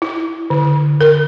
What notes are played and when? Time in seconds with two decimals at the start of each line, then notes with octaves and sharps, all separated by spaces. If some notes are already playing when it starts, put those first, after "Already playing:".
0.02 E4
0.50 D3
1.01 A#4